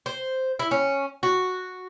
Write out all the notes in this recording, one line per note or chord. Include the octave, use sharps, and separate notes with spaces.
C5
E4
C#4
F#4